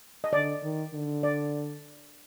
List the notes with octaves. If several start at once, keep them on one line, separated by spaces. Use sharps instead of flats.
D#5
D3 D5
D#3
D3
D5